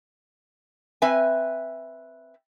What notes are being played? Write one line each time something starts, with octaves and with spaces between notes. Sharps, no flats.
C4 B4 E5 G#5